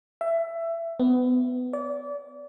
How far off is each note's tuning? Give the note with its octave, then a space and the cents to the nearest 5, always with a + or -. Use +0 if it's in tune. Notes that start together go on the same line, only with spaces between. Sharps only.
E5 +20
B3 +25
D5 -30